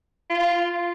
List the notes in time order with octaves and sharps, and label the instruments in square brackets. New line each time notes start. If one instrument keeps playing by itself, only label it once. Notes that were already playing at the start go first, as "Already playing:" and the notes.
[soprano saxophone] F4